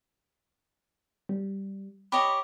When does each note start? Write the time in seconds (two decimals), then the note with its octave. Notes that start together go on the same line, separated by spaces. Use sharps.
1.29 G3
2.12 G4 C#5 D#5 B5